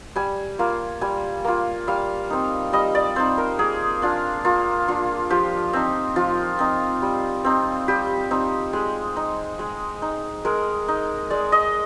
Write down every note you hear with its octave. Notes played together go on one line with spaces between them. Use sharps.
G3 G#5
A#3 F4
G3 G#5
A#3 F4
G3 F5
C4 D#4
G3 D#5
D5
C4 D#4 C5
A#4
A#3 G#4
D4 F4
A#3 F4
D4 F4
F3 G4
C4 D#4
F3 F4
C4 D#4
G3
C4 D#4
G3 G4
C4 D#4
G#3
D#4
G#3
D#4
G#3 A#4
D#4
G#3 D5
D#5